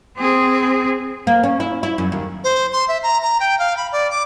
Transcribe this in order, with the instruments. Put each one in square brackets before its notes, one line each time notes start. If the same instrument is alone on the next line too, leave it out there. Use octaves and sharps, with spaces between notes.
[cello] C4 G#4
[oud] A#3
C#4
E4
E4
F#2
D#2
[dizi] C5
C6
E5
A#5
A#5
G5
F5
B5
D5
D6